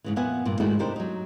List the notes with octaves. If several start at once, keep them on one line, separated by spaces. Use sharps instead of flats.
G#2 C#3 E3
F2 A#2 B3 E5 F#5 G#5
G2 A#2
G#2 D#3 G#3 A3 E4 F#4
C3 D4 D#4 G4 A#4 C5
F#3 D#4